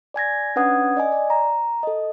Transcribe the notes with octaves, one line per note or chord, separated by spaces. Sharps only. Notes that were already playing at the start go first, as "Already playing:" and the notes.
D5 G#5 G#6 A#6
C#4 D4 B4 F#5 D#6 G#6
D5 D#5 G#5
D5
A#5
A4 D#5